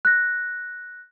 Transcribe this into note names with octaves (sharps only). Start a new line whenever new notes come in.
F#6 A#6